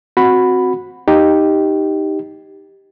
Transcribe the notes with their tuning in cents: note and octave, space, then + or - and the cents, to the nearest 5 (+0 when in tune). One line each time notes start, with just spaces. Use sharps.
C4 +0 F#4 -10 B5 +5
D#4 +0 G4 +0